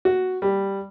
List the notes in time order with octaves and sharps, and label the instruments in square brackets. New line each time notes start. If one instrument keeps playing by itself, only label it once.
[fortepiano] F#4
G3